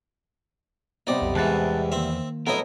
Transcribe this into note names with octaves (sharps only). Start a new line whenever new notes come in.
C3 G3 B3 D#4 D5
B1 F2
E2 G#2 E3 A5 F#6 A6
D#3 A#3 C4 E5
F2 F#3 A3 B3 E4 A4 A#4 D#5